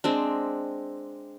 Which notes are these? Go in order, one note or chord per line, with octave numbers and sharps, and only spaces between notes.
G#3 C4 D4